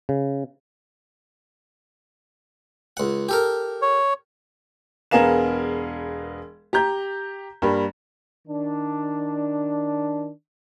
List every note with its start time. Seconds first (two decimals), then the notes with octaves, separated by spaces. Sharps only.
0.09 C#3
2.97 C#2 F#5
3.29 G4 A4 A#4
3.82 C#5
5.11 E1 B3 G#4 A#4 F5 E7
6.73 G4 A#5 G6
7.62 G2 G3 A#3
8.48 D#3 D4